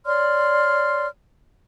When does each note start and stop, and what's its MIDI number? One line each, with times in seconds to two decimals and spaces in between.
0.06 1.06 73
0.06 1.06 74
0.06 1.06 84
0.06 1.06 89